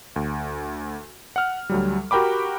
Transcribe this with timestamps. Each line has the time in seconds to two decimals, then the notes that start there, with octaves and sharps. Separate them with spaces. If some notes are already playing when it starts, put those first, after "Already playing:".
0.16 D2
1.36 F#5 F6
1.70 D2 F#3 G3
2.11 F#4 G4 A#4 G5 B5 D6